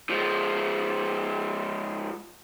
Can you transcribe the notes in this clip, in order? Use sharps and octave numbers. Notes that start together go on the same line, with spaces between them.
F3 G#3